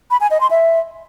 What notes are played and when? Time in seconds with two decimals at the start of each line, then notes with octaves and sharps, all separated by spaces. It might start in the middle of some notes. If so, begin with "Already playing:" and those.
0.11 B5
0.21 G#5
0.31 D#5
0.41 C6
0.51 E5